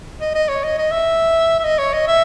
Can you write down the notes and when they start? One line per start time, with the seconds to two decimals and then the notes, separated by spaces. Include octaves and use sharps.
0.21 D#5
0.35 D#5
0.49 C#5
0.64 D#5
0.78 D#5
0.92 E5
1.60 E5
1.65 D#5
1.79 C#5
1.93 D#5
2.08 E5